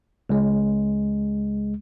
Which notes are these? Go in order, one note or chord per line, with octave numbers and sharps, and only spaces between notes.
C#2 G#3